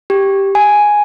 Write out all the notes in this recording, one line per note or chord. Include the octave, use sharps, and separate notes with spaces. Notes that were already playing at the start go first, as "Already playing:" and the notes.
G4
G#5